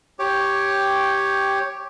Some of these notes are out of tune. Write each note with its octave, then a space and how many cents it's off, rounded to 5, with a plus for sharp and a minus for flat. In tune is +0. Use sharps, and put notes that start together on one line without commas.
G4 +0 C#5 +0 G5 +0